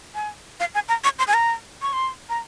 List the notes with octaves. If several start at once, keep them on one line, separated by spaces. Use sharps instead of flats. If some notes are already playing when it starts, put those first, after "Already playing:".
G#5
F5
G#5
A#5
C#6
C6
G#5
A#5
C#6
C6
A#5